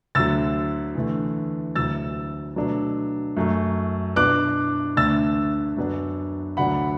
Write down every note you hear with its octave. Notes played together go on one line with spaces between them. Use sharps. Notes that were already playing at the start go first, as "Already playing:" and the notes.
D2 D3 F#3 E6 A6
E2 D3 A3
D2 D3 F#3 E6 A6
B2 F#3 A3 D4
F#2 F#3 A3
B2 B3 D4 D6 F#6
D2 D3 A3 D4 E6 A6
F#2 F#3 B3 D4
D2 D3 F#3 D4 F#5 B5